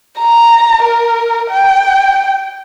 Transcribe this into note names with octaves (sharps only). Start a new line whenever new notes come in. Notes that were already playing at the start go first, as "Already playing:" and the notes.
A#5
A#4
G5